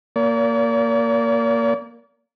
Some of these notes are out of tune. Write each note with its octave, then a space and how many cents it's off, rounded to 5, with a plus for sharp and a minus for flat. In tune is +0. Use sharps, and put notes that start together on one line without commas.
A#3 +0 D5 -40